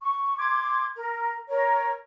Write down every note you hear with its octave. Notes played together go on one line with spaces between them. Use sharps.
C#6
C6 D6 G#6
A#4
A#4 C#5